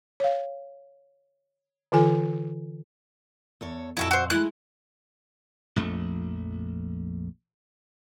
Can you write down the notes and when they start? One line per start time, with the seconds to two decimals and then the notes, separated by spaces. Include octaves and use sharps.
0.20 C#5 F5
1.92 D3 E3 F4 A4 G#5
3.61 E2 A4 C#5
3.97 F2 A#2 E4 F#4 A4
4.11 F#4 C5
4.30 G#3 A3 E4 F#6
5.76 A#1 F2 A3